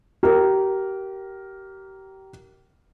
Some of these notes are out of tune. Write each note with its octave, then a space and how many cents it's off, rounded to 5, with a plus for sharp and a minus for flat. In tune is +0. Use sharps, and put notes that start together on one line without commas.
G4 -30 A#4 +0